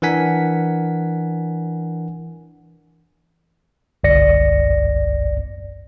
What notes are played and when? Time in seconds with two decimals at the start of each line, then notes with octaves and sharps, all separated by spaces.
0.02 E3 D4 A#4 F#5 G#5 B6
4.04 G1 C2 F#2 D5 A#6 C#7